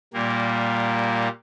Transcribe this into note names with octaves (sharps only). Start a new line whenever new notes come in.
A#2 G3 A#3